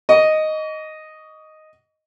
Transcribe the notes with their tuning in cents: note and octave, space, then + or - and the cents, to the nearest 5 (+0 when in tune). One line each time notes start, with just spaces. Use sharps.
D#5 +0 C#6 +40